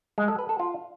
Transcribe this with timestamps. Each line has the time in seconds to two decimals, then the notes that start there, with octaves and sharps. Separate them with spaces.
0.18 G#3
0.28 A4
0.39 B4
0.49 A4
0.59 F4